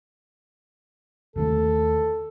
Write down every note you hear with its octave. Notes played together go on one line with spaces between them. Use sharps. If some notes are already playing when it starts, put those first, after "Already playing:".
D#2 D#3 A3 A4